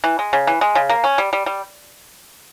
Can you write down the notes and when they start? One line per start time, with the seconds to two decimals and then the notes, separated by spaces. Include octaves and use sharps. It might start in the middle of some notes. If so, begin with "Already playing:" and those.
0.04 E3
0.19 G#3
0.33 C#3
0.47 E3
0.61 G#3
0.75 C#3
0.89 A#3
1.04 C#4
1.18 G3
1.33 G3
1.46 G3